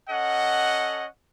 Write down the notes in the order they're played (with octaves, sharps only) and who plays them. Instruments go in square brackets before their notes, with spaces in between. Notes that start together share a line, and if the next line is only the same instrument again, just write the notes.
[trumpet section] C#4 A4 D#5 F#5